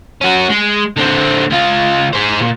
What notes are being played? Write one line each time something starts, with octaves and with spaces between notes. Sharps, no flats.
C#4 F#4
G#3
D3 C4
C#2 F4
G#4 C5
A#2